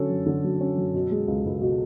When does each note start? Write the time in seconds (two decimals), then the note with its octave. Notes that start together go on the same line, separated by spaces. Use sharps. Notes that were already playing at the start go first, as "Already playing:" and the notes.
Already playing: D3 F#3 C#4 A4
0.10 F#2
0.26 D3
0.44 F#3
0.60 C#4
0.78 F#2
0.94 B2
1.11 G#3
1.27 C#2
1.46 C#2
1.61 B2